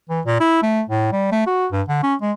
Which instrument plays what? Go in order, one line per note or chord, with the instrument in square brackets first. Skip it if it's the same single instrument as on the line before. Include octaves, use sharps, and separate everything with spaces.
[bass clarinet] E3
A#2
E4
A3
A2
G3
A3
F#4
G2
D3
C#4
G#3